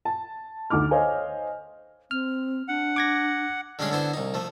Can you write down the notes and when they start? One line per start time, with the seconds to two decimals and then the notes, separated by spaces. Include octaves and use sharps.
0.05 A5
0.70 D2 D#4 D6 F6
0.91 C5 C#5 D#5 F5 G#5
2.11 C4 F6
2.68 D4 F#5
2.96 D6 G#6 A#6
3.79 D3 G3 G#3 C#4 G#4
3.90 D3 B3 E4 C5
4.14 C2 D#4
4.34 F3 A3